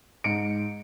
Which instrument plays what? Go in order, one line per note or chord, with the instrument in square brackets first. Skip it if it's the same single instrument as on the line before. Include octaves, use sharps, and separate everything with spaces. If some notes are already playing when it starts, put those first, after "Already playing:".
[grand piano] G#2 C#7 D7